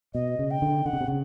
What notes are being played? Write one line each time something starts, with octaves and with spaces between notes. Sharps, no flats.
B2 D#5
C#3
G5
D3
D3 F#5
C#3
C3
C#3